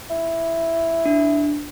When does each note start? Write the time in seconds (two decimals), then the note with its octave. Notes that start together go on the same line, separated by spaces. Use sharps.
0.10 E4
1.06 D4